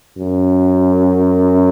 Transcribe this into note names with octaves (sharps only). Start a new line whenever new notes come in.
F#2